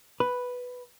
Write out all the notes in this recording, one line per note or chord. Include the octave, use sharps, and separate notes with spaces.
B4